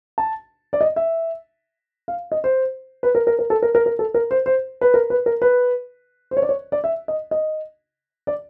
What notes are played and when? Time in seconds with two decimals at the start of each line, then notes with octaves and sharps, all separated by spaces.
0.18 A5
0.73 D5
0.81 D#5
0.96 E5
2.08 F5
2.32 D#5
2.44 C5
3.03 B4
3.15 A#4
3.27 A#4
3.39 A#4
3.50 A4
3.62 A#4
3.75 A#4
3.86 A#4
3.99 A4
4.14 A#4
4.31 C5
4.46 C5
4.81 B4
4.94 A#4
5.10 B4
5.26 A#4
5.42 B4
6.31 C5
6.37 C#5
6.42 D5
6.49 C#5
6.72 D5
6.84 E5
7.08 D#5
7.31 D#5
8.27 D5